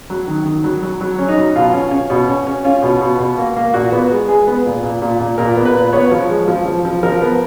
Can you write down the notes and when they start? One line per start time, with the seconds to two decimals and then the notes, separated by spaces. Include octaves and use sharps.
0.10 F#3
0.27 D#3
0.46 D#3
0.64 F#3
0.83 F#3
1.01 F#3
1.19 C#4
1.28 D#4
1.37 F#3
1.56 B2 F4
1.74 C#4
1.91 C#4
2.10 B2
2.28 C#4
2.47 C#4
2.65 C#4 F4
2.82 B2
3.01 B2
3.19 B2
3.38 A#3
3.56 A#3
3.74 A#2 F#4
3.92 B3
4.11 G#3
4.28 G#3 G#4
4.47 B3
4.66 A#2
4.83 A#2
5.02 A#2
5.20 A#2
5.38 A#2 A#4
5.56 B3
5.65 B4
5.74 A#2
5.93 B3 C#5
6.12 F3
6.29 G#3
6.48 F3
6.66 F3
6.85 F3
7.03 F3 A#4
7.21 B3